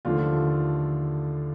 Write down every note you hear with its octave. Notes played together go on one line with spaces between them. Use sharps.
D#2 D3 F3 A3 F4